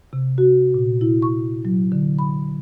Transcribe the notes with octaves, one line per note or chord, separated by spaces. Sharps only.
C3
F#4
A#2
E4
C#6
F#3
D3
B5